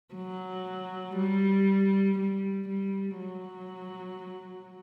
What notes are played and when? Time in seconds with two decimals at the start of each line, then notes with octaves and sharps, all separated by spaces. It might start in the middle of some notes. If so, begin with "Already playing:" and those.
0.15 F#3
1.17 G3
2.19 G3
2.68 G3
3.20 F#3